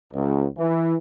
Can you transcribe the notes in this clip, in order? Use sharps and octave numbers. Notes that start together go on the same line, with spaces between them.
C#2
E3